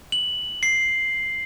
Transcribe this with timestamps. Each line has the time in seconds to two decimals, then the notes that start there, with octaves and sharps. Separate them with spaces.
0.12 F#7
0.63 C7